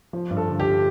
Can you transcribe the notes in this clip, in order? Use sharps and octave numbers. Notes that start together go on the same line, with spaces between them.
F3
G2
A4
D3
G4